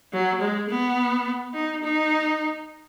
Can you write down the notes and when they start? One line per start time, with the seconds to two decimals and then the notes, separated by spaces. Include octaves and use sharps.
0.13 F#3
0.41 G#3
0.69 B3
1.54 D#4
1.83 D#4